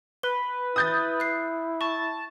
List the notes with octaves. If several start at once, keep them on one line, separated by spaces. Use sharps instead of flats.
B4 G7
E4 D#6 G6 A6
F#6 C7
A5 C#6